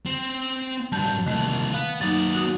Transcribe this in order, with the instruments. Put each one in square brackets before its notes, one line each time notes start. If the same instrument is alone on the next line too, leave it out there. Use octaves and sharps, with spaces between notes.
[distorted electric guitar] C4
[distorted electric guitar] G2 F#3 [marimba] A5 G6
[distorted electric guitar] C2 A#2 [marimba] D#3 A3
[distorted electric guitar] B3 [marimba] F5
[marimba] F#3 A#3 D#4 [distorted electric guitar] B3 D5
[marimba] F#4 D#6